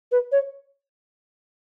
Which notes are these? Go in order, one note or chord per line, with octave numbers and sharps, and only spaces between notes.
B4
C#5